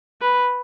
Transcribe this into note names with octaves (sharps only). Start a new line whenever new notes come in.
B4